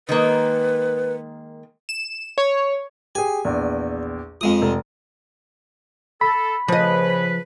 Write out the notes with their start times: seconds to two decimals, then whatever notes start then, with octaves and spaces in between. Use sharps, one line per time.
0.09 D#3 G#3 A#3 B4
1.89 E7
2.38 C#5
3.15 G4 G#4 G#5
3.45 A#1 E2
4.41 F2 F3 G#3 D#6
4.62 F1
6.21 A4 B5
6.68 C#3 F3 B4 D#5